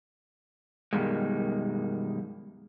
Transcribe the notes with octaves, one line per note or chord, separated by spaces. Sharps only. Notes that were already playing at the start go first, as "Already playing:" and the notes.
F#2 B2 D#3 G3 G#3